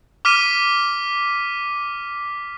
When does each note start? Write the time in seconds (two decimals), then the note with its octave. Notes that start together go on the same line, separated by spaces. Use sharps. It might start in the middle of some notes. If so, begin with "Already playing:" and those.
0.25 D6 F6 B6 D#7